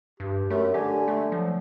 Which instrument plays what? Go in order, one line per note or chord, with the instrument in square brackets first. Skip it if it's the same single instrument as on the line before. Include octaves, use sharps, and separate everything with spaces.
[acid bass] G2 [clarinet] G4
[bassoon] F#2 [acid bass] A3
[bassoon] D3 [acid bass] G4 [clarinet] G#5
[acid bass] A3
[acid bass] F3 [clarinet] F#3